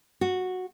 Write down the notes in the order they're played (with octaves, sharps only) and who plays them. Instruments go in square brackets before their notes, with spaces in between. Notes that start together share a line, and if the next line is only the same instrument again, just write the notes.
[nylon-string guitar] F#4